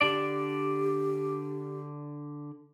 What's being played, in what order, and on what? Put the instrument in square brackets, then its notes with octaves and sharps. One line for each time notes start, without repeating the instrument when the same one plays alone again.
[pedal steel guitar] D3 D4 D5 [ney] G4